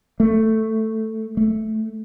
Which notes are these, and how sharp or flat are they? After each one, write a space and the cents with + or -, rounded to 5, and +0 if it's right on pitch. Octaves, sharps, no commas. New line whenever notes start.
A3 +5
A3 -10